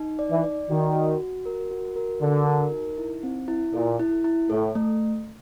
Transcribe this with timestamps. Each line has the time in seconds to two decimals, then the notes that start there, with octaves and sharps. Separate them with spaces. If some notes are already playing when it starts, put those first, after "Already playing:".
Already playing: D#4
0.19 D5
0.31 E3
0.44 D5
0.70 D#3 F#4
0.95 F#4
1.20 F#4
1.46 A#4
1.71 F#4
1.96 A#4
2.22 D3 F#4
2.47 A#4
2.72 D#4
2.98 E4
3.23 C4
3.48 E4
3.74 A#2 A4
4.00 E4
4.24 E4
4.50 A2 A4
4.75 A3